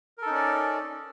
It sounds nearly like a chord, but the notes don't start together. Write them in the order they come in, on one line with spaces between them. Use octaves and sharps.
A#4 A4 D#4 C#4 D5